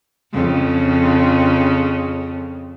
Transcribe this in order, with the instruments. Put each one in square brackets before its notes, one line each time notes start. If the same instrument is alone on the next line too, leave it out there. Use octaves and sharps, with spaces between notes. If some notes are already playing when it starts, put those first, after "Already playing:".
[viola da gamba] F2 C#3